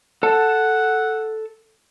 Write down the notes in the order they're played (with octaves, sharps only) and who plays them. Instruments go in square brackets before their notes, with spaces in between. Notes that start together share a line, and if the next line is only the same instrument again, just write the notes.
[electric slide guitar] A4 A5 [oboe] F#5